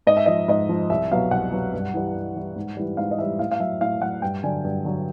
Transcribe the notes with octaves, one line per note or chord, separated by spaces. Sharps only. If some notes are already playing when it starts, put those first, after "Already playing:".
G#2 D#5
E5
F3 D#5
G#2 D#5
F3
C2 E5
B2 F#3 F5
C2 F#5
B2 F#3
G2
E3 G3
G2
E3 G3
G#2
E3 G3
G#2 F5
D#5
E3 G3 E5
A2 F5
F5
F#3 E5
A2 F5
F#3 F#5
G2 G5
D3 F#3 G#5
G2
D3 F#3